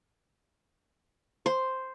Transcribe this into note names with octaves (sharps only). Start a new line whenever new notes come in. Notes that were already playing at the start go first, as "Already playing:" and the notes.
C5